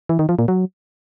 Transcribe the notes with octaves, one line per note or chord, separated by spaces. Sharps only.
E3
D#3
F3
A#2
F#3